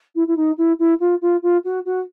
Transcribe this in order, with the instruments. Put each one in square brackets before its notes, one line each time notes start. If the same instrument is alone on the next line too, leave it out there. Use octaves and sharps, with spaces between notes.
[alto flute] E4
E4
D#4
E4
E4
F4
F4
F4
F#4
F#4